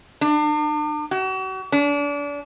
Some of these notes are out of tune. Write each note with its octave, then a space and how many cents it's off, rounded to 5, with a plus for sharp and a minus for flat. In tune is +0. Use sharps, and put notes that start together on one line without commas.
D4 +40
F#4 +40
D4 -30